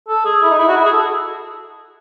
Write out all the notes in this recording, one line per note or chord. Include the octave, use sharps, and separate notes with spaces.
A4
G#4
E4
D#4
E4
F#4
E4
G#4
A4